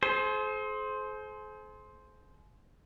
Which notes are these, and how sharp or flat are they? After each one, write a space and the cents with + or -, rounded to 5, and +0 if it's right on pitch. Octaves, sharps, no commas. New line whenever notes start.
G#4 +45 C5 +0